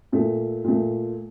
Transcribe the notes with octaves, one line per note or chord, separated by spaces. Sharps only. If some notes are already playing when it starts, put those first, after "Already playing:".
A#2 A3
A#2 A3